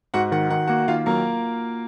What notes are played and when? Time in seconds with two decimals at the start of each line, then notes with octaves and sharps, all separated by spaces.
0.14 G#2 F#4 F#5
0.32 D#3 F#5
0.50 D#3 F#5
0.67 A#3 F#4 F#5
0.88 D#3 F4 F5
1.06 F#3 A#3 A#4